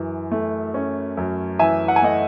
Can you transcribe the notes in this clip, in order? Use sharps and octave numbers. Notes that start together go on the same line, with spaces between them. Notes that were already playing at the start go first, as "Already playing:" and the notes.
Already playing: F#2 E3
A3
C#4
F#2
E3 E5 G#5
F#5
G#5
A3 D#5 F#5